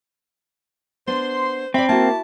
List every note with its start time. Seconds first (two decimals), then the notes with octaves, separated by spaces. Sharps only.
1.07 B3 D4 C5 C6
1.74 C4 D5 E5 B5
1.89 A#3 E4 F#4 A5